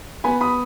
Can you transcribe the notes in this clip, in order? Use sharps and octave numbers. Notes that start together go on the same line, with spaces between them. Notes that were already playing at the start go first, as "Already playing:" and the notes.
B3 G#5 B5
B5 D#6